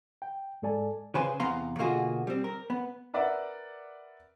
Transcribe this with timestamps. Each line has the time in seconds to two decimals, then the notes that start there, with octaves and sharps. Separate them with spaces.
0.22 G5
0.62 G#2 G#3 A4 D5 G#5 A5
1.15 C#3 B4 C5 G#5
1.40 E2 C3 B3 F5 A#5 C6
1.79 B2 D3 A#3 F4 F#4 G#4
2.27 G3 C4
2.44 A#4
2.70 B3
3.14 A#4 B4 D5 E5 F#5